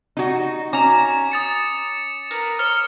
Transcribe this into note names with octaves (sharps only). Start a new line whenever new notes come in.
D#4 F#4
C#4 A#5 D6 F7
D#6 A6 C#7
A#4 B4
C#5 F6